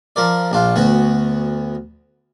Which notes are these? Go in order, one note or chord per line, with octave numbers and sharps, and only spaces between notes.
F3 A#4 D5
A#1 D4 F4
D2 B3 F#4